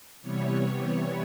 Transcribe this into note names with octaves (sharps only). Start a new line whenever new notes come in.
C3 E3 G3 B3 C#5